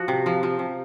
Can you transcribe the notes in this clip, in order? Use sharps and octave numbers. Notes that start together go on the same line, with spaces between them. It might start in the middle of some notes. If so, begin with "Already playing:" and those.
Already playing: F3 F#4
C3
F3
F3
C3